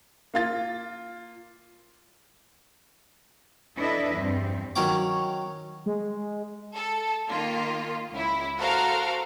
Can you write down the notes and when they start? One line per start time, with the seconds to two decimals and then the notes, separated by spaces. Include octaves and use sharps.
0.34 A#3 F4 A6
3.78 D4 E4 A4 B4 D#5 E5
4.14 E2 G2 C4
4.76 D#3 F#3 C#4 F#5 D6
5.86 G#3
6.75 A4
7.29 D#3 A#3 F4
8.12 C#2 E4
8.59 F#4 A4 A#4 C5 F5 A#5